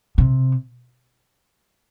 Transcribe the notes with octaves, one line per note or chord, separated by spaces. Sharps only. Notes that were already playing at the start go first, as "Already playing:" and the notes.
C3